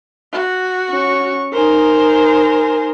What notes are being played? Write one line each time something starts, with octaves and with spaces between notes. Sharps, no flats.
F#4
C#4 C#6
D#4 A#4 C5 G#5